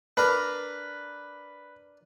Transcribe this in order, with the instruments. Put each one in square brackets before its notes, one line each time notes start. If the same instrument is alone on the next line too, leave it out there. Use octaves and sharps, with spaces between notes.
[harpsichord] D4 A#4 [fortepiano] B4